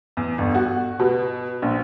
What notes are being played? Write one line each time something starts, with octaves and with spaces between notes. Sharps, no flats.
E2
G1
F#4
B2
A#1